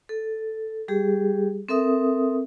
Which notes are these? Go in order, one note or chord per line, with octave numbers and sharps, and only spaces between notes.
A4
G3 G4 G#4
C4 A4 A#4 E5 D#6